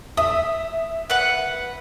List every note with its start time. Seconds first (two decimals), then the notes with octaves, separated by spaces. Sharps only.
0.17 E5 D#6
1.10 B4 F#5